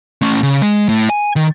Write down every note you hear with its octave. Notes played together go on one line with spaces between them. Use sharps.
A3 C#4
C#3
G#3
A2
G#5
D#3